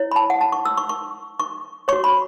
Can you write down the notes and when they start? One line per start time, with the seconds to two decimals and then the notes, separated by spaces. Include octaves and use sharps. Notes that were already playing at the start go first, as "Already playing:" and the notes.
Already playing: E4 C#5
0.11 B5
0.16 A5
0.30 F#5
0.41 A5
0.52 C#6
0.65 E6
0.77 C#6
0.89 C#6
1.39 C#6
1.88 F#4 C#5 C#6
2.04 B5